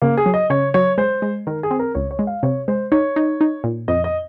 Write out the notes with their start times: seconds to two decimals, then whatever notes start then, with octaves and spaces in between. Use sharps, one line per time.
0.02 C#3 A#3
0.17 G#4
0.26 F#3
0.34 D#5
0.50 C#3 C#5
0.74 F#3 C#5
0.98 G#3 C5
1.22 G#3
1.47 D#3 A#4
1.63 G#4
1.71 C4
1.79 A#4
1.95 C#2 C#5
2.11 C#5
2.19 G#3
2.27 F5
2.43 C3 C#5
2.68 G#3 C5
2.92 D#4 C#5
3.16 D#4
3.41 D#4
3.64 A#2
3.88 F2 D#5
4.04 D#5